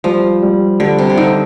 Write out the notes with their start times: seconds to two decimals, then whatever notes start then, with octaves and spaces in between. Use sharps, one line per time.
0.04 F3 G3
0.42 G3
0.80 D3 G3
0.98 C3
1.10 C3
1.17 D3 D#4